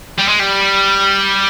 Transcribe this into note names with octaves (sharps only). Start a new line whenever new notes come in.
G3
G#3
G3